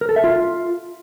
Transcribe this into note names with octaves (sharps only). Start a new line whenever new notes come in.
A#4
A4
E5
F4